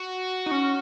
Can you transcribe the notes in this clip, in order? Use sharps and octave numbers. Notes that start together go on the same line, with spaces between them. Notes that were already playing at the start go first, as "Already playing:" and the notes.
Already playing: F#4
D#4
C#4